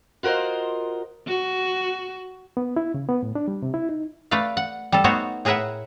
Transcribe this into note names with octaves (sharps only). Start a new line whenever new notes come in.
F4 F#4 A#4 C5 D#5
F#4
B3
E4
C#3
B3
A2
D4
G3
C3
E4
D#4
A3 B4 D5 F5
F#5
G3 A4
A3 B3 D#4 F#4 C5 C#5
A2 G#4 A#4 B4 E5 F#5